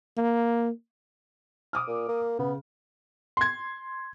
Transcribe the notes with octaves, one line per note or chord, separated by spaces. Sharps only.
A#3
D6 D#6 F6
A#2
A#3
C#3 B3
C6 G#6